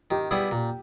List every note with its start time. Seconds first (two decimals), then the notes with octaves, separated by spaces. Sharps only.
0.11 D#3 G4
0.31 G3 B3 E4 G#4
0.51 A#2